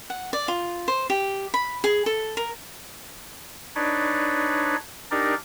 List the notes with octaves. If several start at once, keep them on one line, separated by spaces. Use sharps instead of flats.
F#5
D5
F4
C5
G4
B5
G#4
A4
A#4
D4 D#4 B4 C#5 D5
D4 D#4 G4 A#4 D5